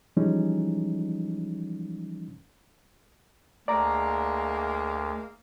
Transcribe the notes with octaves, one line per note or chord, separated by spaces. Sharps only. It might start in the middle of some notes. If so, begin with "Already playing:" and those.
E3 F3 G3 G#3 C#4 D#4
D2 G#3 A#3 D5 A#5